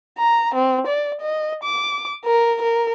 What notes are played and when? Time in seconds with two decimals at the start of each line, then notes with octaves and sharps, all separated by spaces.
0.18 A#5
0.55 C4
0.87 D5
1.21 D#5
1.64 D6
2.25 A#4
2.62 A#4